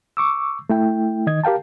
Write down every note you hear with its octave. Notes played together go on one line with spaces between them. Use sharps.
C#6 D6 E6
A3 E4 G5
D#3 D#5 G#6
G4 A#4 F5 G5 A5